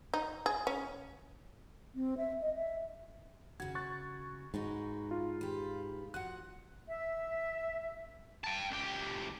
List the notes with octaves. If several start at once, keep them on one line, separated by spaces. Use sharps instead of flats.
D#4
G#4
C#4
C4
E5
D#5
E5
C#3 F#4 G#6
C#6 F#6 A6
G#2 D#4 F#4 B4
F4
G4 B4
F3 F#4 F#5 F#6
E5
G5 A5
C#2 G4